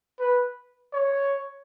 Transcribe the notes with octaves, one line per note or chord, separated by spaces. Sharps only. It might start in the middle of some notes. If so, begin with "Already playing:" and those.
B4
C#5